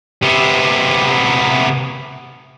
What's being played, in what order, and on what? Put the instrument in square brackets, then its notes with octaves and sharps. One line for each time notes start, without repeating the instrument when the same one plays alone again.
[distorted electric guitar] C3 B3